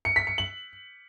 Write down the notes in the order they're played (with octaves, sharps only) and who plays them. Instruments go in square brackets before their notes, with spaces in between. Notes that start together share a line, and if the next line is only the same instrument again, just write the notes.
[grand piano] C#7
B6
C#7
F#7